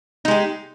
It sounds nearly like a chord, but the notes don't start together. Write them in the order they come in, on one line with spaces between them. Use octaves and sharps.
D#4 G#3 G4